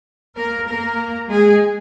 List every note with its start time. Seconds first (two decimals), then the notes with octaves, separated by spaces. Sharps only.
0.35 A#3 A#4
0.66 A#3 A#4
1.31 G#3 G#4